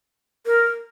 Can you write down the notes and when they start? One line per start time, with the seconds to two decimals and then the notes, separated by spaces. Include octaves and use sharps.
0.46 A#4